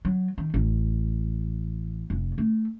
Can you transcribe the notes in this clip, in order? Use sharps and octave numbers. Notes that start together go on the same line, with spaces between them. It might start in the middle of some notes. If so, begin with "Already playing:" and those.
F#3
D#3
A1
F1
A3